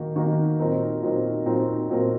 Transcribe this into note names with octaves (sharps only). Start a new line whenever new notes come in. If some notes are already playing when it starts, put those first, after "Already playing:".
Already playing: D#3 A#3 D#4 F#4
D#3 A#3 D#4 F#4
A#2 F#3 C4 D#4 A#4
A#2 F#3 C4 D#4 A#4
A#2 F#3 C4 D#4 A#4
A#2 F#3 C4 D#4 A#4